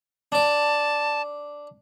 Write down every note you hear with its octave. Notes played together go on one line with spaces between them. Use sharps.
D4 D5 A5